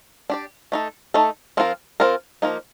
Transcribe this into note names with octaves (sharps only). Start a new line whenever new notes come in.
D4 G4 D5
A3 D#4 A4
A3 D#4 A4
F3 C4 F4 A#4
F3 C4 F4 A#4
F3 A#3 D#4